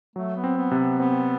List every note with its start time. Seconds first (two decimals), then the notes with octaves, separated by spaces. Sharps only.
0.16 F#3 A3
0.36 B3
0.44 C4
0.57 B3
0.71 C3
0.79 B3
0.99 B3 C4